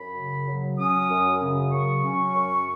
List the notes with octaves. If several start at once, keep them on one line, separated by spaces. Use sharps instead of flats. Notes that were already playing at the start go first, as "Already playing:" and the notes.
Already playing: F#2 B5
C#3
F#3
C#4 D#6
F#2
C#3
F#3 C#6
C#4
F#2